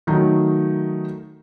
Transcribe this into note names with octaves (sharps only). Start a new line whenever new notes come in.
D#3 F#3 A3 D#4